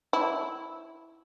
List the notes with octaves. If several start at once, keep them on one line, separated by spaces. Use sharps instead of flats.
E4